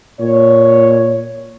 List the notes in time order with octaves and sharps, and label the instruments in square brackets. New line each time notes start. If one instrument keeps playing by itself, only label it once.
[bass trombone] A#2 [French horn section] C#5